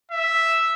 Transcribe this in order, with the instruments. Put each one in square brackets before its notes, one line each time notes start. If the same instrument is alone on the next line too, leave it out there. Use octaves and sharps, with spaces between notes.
[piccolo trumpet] E5